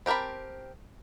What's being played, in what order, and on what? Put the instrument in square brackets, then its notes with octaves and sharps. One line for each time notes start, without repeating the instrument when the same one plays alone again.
[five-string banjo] C4 G4 A#4 A5 B5